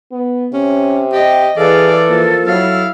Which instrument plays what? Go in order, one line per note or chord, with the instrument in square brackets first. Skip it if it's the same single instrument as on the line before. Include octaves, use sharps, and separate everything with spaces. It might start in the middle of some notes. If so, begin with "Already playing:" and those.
[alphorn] B3
[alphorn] C3 [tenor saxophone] C#4
[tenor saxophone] G4 [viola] D#5
[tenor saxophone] E3 [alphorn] G#4 [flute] A4 [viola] D5 F5
[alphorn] F3 [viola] A#3
[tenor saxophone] F#3 [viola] E4 F5